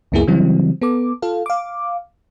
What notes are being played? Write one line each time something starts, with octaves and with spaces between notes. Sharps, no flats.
C#2 F#2 A#3 B3 E4 G#4
C#3 E3 F#3 G3 C4
B3 A4 D6
F4 A4 F5
F5 D6